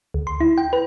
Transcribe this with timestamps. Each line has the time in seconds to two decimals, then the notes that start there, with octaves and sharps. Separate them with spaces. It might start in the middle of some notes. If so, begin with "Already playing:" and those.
0.14 D2
0.27 C6
0.40 E4
0.58 G5
0.73 B4